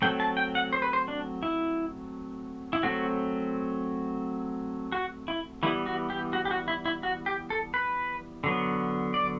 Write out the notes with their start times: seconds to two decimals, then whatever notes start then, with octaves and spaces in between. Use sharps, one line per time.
0.02 F#3 A3 C4 G5
0.20 A5
0.37 G5
0.55 F#5
0.73 C5
0.82 B4
0.93 C5
1.08 D4
1.43 E4
2.73 E4
2.83 F#3 A3 C4 F#4
4.92 F#4
5.28 E4
5.63 E3 G3 B3 E4
5.86 F#4
6.10 G4
6.33 F#4
6.45 G4
6.51 F#4
6.68 E4
6.86 E4
7.03 F#4
7.26 G4
7.50 A4
7.74 B4
8.44 D3 F#3 B3
9.14 D5